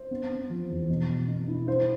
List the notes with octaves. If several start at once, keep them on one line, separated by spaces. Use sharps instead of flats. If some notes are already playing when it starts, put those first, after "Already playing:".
Already playing: C5
B3
B3
F3
E2
B2
B2
B2
E4
E4 C5